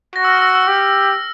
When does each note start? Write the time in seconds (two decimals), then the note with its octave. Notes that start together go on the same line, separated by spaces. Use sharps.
0.15 F#4 A#6
0.24 E6
0.29 F6
0.42 E6
0.55 E6
0.68 G4